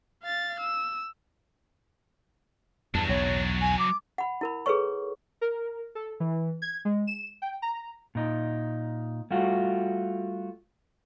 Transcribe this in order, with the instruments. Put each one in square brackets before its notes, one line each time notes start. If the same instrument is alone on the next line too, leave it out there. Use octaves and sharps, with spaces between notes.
[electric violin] F5 A6
E6
[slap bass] E2 G2 [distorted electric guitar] F#3 D4 [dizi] A5
[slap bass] B1 E2 [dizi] C#5
[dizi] G#5
D6
[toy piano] F#5 B5
E4 A#4 B5
G#4 A4 B4 C#5 C#6
[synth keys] A#4
A4
E3
G#6
G#3
E7
G5
A#5
[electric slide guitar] A#2 D#4
G3 A3 F4 F#4